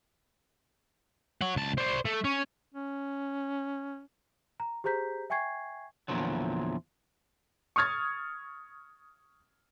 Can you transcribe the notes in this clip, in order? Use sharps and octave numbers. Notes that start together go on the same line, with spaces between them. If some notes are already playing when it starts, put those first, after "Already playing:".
C#5 F#5
C#2 A5
C5 D5
A3
C#4
C#4
A#5
G4 G#4 C5 A#5 G6 B6
E5 G5 G#5 C#6 G#6 C7
E2 A#2 D3 F3 F#3
C#6 D#6 F6 G#6 A6